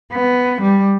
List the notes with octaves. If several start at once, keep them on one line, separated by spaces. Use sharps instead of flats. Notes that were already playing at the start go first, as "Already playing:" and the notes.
B3
G3